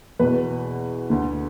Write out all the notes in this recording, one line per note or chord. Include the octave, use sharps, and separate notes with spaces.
E2 B2 B4
D2 D3